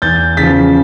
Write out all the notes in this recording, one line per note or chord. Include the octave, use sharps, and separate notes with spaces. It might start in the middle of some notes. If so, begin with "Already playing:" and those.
E2 G6 A6
C#3 F3 A6 B6